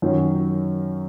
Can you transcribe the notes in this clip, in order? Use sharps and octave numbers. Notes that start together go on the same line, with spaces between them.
F#2 D#3 F#3 C#4